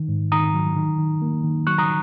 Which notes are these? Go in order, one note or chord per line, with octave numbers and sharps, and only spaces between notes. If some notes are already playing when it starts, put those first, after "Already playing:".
Already playing: D#3
G#2
D#3 A#5 D#6
F#3
D#3
D#3
A#3
D#3
F#3 C#6 F#6
A#5 D#6